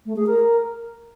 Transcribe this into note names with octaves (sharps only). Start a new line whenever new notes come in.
A3
G#4
A#4